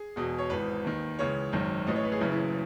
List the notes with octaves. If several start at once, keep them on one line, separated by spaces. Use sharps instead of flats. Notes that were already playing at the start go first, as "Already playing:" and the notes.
Already playing: G#4
E1 E2 B2
C#5
G#1 G#2 E3 B4
D#2 D#3
C#2 C#3 E3 C#5
G#1 F#2 D#3
A1 A2 E3 D#5
C#5
B4
G#4
F#1 F#2 C#3 E3 E4
E4